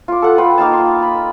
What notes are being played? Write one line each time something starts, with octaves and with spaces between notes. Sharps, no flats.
F4 D6
A4 F#5
F4 B4 G5
A#3 D#4 F5 A5
C6
B5